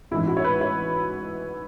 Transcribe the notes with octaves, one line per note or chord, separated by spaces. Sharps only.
A1 G#2 E3 E4
F#4
C#5
B4
C#5